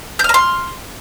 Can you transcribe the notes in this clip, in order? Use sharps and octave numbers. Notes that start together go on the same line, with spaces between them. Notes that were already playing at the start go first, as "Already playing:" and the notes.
A#5 C6 F6 G6